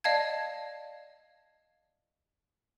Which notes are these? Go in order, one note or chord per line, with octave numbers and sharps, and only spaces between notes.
D5 D#5 F5 A5 G#6